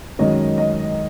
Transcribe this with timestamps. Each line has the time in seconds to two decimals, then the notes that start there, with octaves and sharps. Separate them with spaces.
0.19 F#2 D#3 G#3 C#4 D#5
0.58 D#5